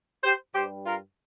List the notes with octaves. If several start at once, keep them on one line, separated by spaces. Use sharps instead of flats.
G4 C5
G2 G3 G4 C5
F4 A#4